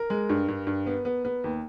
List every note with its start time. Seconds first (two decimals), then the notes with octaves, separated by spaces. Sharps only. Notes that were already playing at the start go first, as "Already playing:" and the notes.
Already playing: A#4
0.10 G#3
0.29 G2
0.48 G2
0.67 G2
0.86 B3
1.05 B3
1.25 B3
1.44 D#2